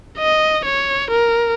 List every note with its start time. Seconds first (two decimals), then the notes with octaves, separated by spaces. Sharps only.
0.18 D#5
0.65 C#5
1.11 A#4